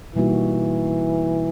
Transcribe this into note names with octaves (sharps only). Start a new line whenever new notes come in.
B2 E3 G3 A#3 D#4 F#4